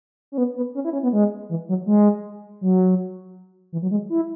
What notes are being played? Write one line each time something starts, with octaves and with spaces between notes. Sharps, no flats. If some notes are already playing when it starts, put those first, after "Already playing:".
C#4
B3
B3
C#4
E4
C#4
B3
G#3
E3
F#3
G#3
F#3
E3
F#3
G#3
E4